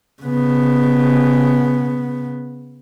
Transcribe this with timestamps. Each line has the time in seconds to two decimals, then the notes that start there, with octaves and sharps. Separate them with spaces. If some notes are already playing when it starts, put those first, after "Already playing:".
0.22 C#3 B3